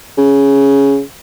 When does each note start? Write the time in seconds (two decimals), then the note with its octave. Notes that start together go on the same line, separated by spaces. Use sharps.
0.18 C#3